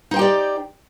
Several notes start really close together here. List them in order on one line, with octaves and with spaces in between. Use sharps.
D#4 C5 G5 G4 D5